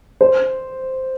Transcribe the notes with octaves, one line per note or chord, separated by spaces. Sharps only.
C5